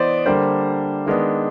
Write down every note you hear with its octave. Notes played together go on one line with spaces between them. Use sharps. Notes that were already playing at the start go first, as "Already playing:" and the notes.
Already playing: E3 B3 C5 D5 D#5
D3 G3 A#3 D4 C5
D#3 G#3 B3 D4